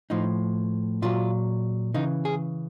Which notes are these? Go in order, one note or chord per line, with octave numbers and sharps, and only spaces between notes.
A2 F3 D#4
A#2 F#3 F4
C#3 E3 D#4
G#4